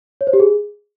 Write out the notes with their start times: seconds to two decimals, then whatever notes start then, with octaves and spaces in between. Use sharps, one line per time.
0.21 C#5
0.27 C5
0.33 G4
0.40 G#4